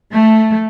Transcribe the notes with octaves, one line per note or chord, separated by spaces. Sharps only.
A3